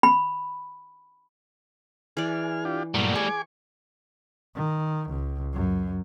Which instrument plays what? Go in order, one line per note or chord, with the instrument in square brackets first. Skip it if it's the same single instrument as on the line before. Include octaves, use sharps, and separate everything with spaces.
[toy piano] B5
[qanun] E3 B4 D5 [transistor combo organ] G#4 F6
[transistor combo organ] D4 F4 G4
[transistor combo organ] G2 A#2 F#3 [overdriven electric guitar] G3 A3
[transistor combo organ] G#4 G#5 D6 [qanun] C#6
[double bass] D#3
C#2
F#2